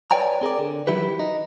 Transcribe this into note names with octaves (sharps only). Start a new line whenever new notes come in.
B4 C#5 D5 G5 G#5 A#5
C4 G#4 A#4 D5
D3
D#3 E3 F#3 E4 G4 B4
D#4